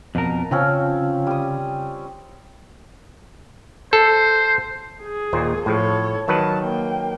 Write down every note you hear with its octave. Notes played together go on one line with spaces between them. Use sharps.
F2 B2 A#4 A5
C#3 F3 C4 C#4
G3 D#6
A4 C5
G#4
D#2 A#2 C5
A2 F3 A4 C#5
D#3 F#3 B4 A5
A#3 G5